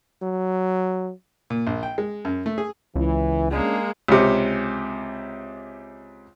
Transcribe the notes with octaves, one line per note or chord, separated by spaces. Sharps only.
F#3
A#2
A#1
G5
G#3
F#2
A3
G#4
C#2 E3
G#3 A#3 C#4 D4 G#4
C#2 C3